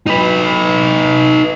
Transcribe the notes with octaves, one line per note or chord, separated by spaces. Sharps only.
D#4 B4